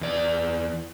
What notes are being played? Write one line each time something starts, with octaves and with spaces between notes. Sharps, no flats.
E2 D5